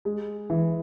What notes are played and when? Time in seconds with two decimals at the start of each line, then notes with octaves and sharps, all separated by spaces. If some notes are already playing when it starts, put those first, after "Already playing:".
0.05 G#3
0.50 E3